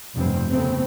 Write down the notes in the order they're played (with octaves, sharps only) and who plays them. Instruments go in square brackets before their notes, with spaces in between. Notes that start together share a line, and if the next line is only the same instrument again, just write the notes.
[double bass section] F1 B1 G2 C4
C#3 A3 B3 C4